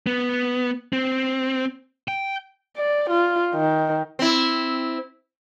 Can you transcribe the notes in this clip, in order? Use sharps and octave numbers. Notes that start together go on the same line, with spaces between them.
B3
C4
G5
D5
F4
D#3
C4 E4